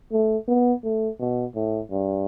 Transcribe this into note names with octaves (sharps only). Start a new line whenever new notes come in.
A3
B3
A3
B2
A2
G2